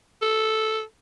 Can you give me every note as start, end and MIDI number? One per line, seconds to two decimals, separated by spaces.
0.22 0.81 69